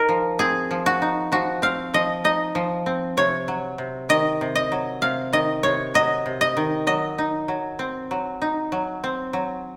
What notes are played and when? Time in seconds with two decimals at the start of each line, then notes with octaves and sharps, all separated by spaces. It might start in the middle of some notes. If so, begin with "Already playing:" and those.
Already playing: D#4 A#4
0.09 F3
0.39 C4 G#4
0.71 F3
0.86 F#4
1.02 D#4
1.32 F3 F#4
1.62 C4 F5
1.94 F3 D#5
2.24 D#4 D#5
2.55 F3
2.86 C4
3.17 C3 C#5
3.48 F#3
3.78 C3
4.09 D#3 D#5
4.41 C3
4.55 D#5
4.72 F#3
5.02 C3 F5
5.33 D#3 D#5
5.63 C3 C#5
5.94 F#3 D#5
6.26 C3
6.41 D#5
6.57 D#3
6.87 F#3 D#5
7.18 D#4
7.48 F#3
7.79 C4
8.11 F#3
8.42 D#4
8.72 F#3
9.04 C4
9.33 F#3